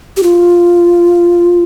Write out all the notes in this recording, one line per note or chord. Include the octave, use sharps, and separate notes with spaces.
G4
F4